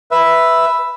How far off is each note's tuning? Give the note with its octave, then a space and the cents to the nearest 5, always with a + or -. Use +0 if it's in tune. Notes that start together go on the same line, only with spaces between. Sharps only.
B4 +0 E5 +0